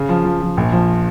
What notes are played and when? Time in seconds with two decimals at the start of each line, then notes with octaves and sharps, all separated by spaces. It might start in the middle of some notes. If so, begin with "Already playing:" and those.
Already playing: C#3
0.09 F3
0.25 F3
0.42 F3
0.57 A#1
0.72 F3